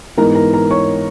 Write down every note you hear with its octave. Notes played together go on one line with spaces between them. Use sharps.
G#2 E3 B3 D#4 A#4 A#5
A#4 A#5
A#4 A#5
C#5 C#6